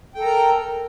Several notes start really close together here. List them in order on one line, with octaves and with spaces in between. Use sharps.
G5 A4 A#5 A#4